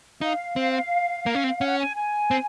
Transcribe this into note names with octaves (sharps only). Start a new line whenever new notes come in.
D#4 F5
C4
A#3
C#4
C4
C#4 F#5
G#5
G#5
C4